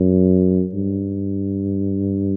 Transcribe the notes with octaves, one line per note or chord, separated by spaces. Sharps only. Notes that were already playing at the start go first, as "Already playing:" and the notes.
Already playing: F#2
G2